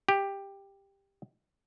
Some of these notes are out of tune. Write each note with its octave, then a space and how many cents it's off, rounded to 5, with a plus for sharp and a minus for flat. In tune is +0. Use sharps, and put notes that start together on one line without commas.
G4 +10